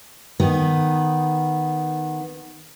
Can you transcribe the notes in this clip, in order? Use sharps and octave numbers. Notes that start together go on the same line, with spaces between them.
D#3 B3